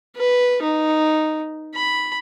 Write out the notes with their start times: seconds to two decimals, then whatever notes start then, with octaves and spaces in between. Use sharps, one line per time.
0.16 B4
0.62 D#4
1.75 B5